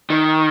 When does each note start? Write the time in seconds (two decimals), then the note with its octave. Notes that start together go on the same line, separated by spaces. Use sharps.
0.10 D#3